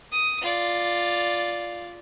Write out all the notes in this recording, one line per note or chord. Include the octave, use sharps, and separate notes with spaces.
D#6
F4 D5